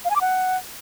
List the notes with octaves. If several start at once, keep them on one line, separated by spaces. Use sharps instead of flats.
F5
G#5
D6
F#5